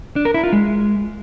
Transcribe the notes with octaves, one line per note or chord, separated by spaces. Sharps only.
D4
A#4
E4
F4
G#3